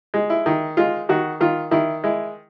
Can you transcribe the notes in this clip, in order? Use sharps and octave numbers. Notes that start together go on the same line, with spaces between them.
G#3
E4
D#3
G#3 F4
D#3 F#4
D#3 F4
D#3 E4
G#3 E4